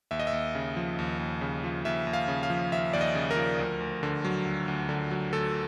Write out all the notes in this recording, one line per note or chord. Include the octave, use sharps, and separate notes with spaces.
D#2 E5
D#5
E5
D#2
C#3
F3
D#2
D#2
C#3
F3
D#2 E5
D#2
F5
C#3
F5
F3
D#2 E5
D#2 D5
D#5
C#3
A#4
F3
D2
D2
D3
F#3
D2
D2
D3
F#3
D2 A4